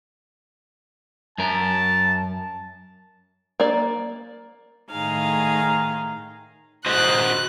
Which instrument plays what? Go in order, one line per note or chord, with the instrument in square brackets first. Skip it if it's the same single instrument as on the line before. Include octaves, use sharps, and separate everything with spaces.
[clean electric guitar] F#2 A#4 [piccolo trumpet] A5
[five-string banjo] A#3 D5
[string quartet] A2 D#3 D#4 G#4 F5
[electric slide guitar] F#4 C5 D#5 [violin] F#6